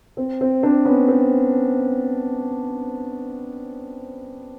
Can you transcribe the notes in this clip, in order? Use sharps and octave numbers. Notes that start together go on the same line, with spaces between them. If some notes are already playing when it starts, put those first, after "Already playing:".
C4
C4
C4 D4
B3 C#4
C4